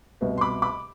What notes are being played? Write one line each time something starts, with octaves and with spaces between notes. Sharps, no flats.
C2 B2 B3
C6
B5 D6
B5 D6